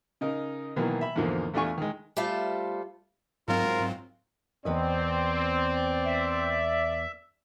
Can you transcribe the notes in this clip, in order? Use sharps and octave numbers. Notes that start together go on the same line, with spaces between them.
C#3 D#4 A#4
B2 D#3 E3 F#3 A#3
E5 B5
E2 G#2 D3 F3 A#3
E2 A3 D4 F4 G#5 C#6
D#3 G#3
G3 A3 F4 A4 C5
G#2 F#3 C4 F4 A#4
E2 C4 B4 D5 D#5
E5